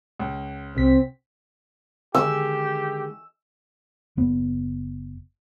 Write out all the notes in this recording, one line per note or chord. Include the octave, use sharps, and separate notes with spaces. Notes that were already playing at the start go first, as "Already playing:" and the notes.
C#2
C2 C3 C4 B6
D3 D#3 G#3 G4 E6
F#1 B3